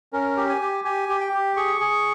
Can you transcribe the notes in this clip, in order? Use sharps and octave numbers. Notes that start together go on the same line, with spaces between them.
C#4 A#4
G4
G#5
G4
G4 G#5
G4
G5
G4
G#4 C#6
G#4